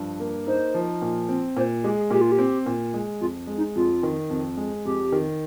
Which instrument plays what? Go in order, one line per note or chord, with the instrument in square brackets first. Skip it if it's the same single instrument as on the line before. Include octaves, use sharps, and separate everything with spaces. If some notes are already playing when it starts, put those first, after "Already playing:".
Already playing: [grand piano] G2 F3
A#3
[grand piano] D#4 [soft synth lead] C5
[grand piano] F3
A#2
C4
[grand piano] A#2 [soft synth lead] C5
[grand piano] G#3 [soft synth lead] G4
[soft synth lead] G#4
[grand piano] A#2 [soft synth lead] G4
[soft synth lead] F4
G4
[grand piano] C4
A#2
G#3
[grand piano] F2 [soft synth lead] F4
[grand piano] G#3
[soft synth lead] D#4
[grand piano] F2 [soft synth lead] F4
[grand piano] D#3
F2
G#3
[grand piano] F2 [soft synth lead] G4
[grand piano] D#3